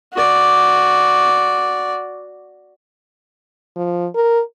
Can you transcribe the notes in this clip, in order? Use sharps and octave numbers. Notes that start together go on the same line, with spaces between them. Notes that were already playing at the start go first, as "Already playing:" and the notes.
F#4 D5
F3
A#4